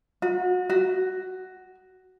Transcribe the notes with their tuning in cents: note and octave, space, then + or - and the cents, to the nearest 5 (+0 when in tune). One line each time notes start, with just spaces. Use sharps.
F#4 -30
F#4 +10